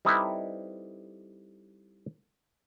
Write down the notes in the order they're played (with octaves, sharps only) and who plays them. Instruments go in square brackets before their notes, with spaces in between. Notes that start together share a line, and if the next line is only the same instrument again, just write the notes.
[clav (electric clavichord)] G3 C4 D#4 E4 A4 B4